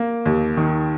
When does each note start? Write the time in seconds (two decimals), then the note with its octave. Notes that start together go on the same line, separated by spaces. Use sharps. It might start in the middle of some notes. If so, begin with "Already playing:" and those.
Already playing: A#3
0.26 D#2
0.57 D#3